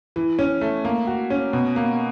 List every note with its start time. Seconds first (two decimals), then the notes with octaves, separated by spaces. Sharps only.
0.16 E3
0.39 C#4
0.61 A3
0.85 A#3
1.07 F#4
1.30 C#4
1.53 B2
1.76 A#3